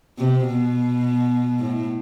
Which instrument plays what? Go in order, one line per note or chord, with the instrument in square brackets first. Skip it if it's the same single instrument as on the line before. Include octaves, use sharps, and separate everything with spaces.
[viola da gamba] C3
B2
A2